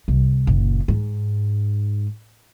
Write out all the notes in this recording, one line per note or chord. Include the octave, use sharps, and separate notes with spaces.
C2
F#1 A#2
G#2